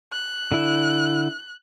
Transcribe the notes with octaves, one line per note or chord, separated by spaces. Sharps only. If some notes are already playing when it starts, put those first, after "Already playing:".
F#6
D3 E4